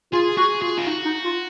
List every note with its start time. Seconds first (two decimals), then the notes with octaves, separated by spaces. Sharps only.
0.13 F4 G#4
0.37 F#4 G#4
0.62 F4 G#4
0.78 F4
0.87 D#4 F#4
1.05 D#4
1.24 F4